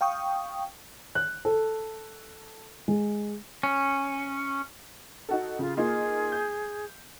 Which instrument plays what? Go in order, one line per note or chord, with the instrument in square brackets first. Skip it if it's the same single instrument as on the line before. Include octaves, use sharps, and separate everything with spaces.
[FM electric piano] F5 G5 C#6 D#6
[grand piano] F#6
A4
G#3
[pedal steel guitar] C#4
[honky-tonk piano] D#4 F#4 A4
[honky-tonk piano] C#3 [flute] F4
[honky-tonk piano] A#3 D#4 F4 [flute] G#4
[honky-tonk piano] G6